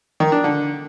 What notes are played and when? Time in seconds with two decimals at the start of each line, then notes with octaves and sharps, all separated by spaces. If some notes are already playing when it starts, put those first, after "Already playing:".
0.20 D#3
0.32 D4
0.44 D3